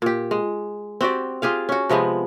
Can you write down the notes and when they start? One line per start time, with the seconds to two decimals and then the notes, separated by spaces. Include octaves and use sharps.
0.02 A#2 G4
0.31 G#3
1.01 C4 F#4 G4 D5
1.42 F4 G4 G#4 F5
1.69 C#4 F#4
1.89 C3 F3 G#3 B3